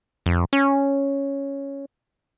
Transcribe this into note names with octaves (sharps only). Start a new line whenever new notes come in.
F2
C#4